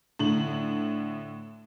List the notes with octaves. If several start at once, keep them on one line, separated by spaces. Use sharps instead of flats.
A2 D3 F#7